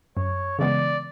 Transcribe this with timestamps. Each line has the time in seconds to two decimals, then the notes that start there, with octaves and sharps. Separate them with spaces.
0.17 F#2 C#5
0.59 C#3 E3 G#3 B3 D5